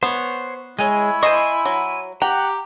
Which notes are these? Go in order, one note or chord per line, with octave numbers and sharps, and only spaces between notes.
B3 C5 C#5
G#3 E4 C#5 D#5 G#5
C5 D#5 G#5 A5 C6 C#6
F#3
G4 F#5 G5 A#5